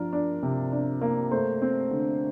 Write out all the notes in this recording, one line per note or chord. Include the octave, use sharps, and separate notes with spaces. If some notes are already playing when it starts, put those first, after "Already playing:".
Already playing: F3 D4 A#4
D4
C3
D4
A#3
A3 C5
C4
D3